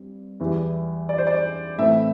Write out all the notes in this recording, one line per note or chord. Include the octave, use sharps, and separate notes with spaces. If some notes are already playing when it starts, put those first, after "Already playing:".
Already playing: G2 C4
E2 E3 G3
D5
C5
D5
A2 E3 A3 C4 E5